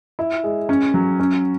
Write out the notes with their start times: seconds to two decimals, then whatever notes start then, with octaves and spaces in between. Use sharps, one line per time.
0.19 E4
0.44 G#3
0.69 C#4
0.94 F#3
1.20 C#4